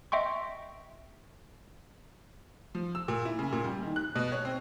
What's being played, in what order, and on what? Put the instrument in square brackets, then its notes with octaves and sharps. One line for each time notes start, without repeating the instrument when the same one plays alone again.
[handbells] D#5 E5 G5 C6 C#6
[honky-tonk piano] F3
E6
A#2
E4
C#3
A#2
G3
D#3
F#6
B2
C#5
C4